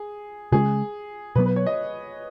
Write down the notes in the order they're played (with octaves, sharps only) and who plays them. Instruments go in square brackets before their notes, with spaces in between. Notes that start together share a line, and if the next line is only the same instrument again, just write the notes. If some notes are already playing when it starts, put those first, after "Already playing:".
Already playing: [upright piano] G#4
[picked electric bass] C#3 G#3 C#4 [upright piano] G#4
[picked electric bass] B2 F#3 B3 [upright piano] B4
[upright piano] B4
C#5
D#5